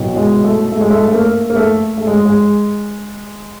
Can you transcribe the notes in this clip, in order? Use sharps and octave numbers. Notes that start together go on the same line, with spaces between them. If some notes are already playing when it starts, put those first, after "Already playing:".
Already playing: C2 B2 F#3
G#3
A3
A3
G#3
A3
A3
A#3
A#3
A3
A3
G#3
G#3